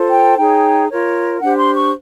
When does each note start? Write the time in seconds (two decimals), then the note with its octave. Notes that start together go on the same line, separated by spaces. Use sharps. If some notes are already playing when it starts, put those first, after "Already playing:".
Already playing: F4 A4 C5
0.11 G5
0.37 D#4 G#4 C#5 G5
0.89 F4 A#4 C#5
1.40 D4 G4 C5 F#5
1.57 C6
1.74 C#6